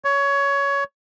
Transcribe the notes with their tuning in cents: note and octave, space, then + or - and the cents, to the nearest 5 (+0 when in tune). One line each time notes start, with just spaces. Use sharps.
C#5 +15